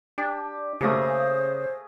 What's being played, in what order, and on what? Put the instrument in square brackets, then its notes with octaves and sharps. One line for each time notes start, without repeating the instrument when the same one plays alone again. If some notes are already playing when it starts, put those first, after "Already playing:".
[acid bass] D4 [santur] G4
[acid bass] C#3 [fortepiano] A3 A#3 G4 [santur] G#4 A#5 D#6 [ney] C5